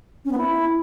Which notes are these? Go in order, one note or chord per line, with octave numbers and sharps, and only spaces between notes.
C#4
B3
E4